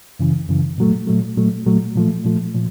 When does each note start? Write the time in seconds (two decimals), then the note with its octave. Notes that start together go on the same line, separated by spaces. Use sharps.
0.20 F#2 C#3 E3
0.49 F#2 C#3 E3
0.78 A#2 F#3 A3
1.07 A#2 F#3 A3
1.37 A#2 F#3 A3
1.66 A#2 F#3 A3
1.95 A#2 F3 A3
2.25 A#2 F3 A3
2.55 A#2 F3